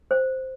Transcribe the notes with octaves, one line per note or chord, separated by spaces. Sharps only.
C5